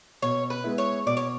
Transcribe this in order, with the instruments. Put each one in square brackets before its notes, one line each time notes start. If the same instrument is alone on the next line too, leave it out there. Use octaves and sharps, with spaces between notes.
[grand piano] B2 [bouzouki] C#5
[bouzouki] B4
[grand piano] G#3 B3 E4
[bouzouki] C#5
[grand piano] B2 [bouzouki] D5
[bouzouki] C#5